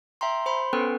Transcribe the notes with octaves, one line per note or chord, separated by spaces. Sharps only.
E5 G5 A#5 C6
C5 B5 C6
B3 C#4 A4 B4 G5